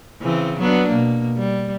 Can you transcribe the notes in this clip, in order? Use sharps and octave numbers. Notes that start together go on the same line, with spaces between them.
C#3 E3 C4
F#3 B3 D4
B2 A#3
G3